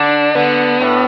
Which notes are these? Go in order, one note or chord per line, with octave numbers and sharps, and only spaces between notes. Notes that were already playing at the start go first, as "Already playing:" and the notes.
Already playing: D3 D4
D3 B3
A2